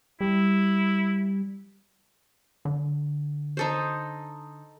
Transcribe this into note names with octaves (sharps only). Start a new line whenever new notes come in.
G3 E4
D3
D#4 A4 C5